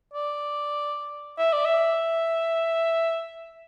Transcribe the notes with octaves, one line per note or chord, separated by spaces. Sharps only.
D5
E5
D5
E5